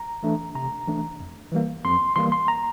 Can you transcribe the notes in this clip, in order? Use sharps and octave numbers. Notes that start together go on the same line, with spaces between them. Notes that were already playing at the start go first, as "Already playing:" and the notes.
Already playing: A#5
E3 A3 D4
C3 A#5
E3 A3 D4
F2
E3 G3 A#3
F2 C6
E3 G3 A#3 C6
C6
A#5